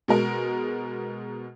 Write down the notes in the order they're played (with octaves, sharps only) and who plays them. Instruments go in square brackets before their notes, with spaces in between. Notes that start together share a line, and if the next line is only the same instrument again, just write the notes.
[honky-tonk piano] B2 G#3 A#4